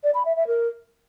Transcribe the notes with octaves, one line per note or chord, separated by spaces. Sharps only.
D5
B5
E5
E5
A#4